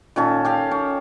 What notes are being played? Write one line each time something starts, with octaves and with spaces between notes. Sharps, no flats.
A#2 D#3 C#4 A4
G4 A4 F5
C#4